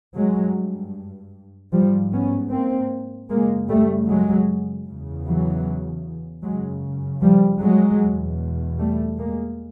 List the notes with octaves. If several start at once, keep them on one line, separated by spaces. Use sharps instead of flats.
G2 F#3 G#3
G#2 F3 G3
B3 C#4
A#3 C4
F#2 C#3 G#3 A#3
G3 A3
F#3 G#3
E2 C#3
E3 F#3
F#2 C#3 F#3 G#3
F3 G3
F#3 G#3
E2 B2
G3 A3
G#3 A#3